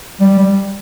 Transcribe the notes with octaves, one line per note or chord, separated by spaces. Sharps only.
G3
G3